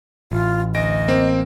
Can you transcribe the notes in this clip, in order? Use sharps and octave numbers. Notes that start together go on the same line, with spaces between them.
A1 F4
D2 D#5 A#6 D7
A#3 C4